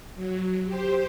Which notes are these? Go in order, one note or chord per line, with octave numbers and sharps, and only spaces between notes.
F#3
G4 C5